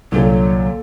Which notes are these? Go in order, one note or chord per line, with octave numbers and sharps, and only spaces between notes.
C2 A#2 D3 F#3 A#3 A4